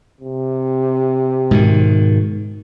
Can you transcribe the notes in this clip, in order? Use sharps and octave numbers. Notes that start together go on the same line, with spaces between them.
C3
G#2 B2 D#3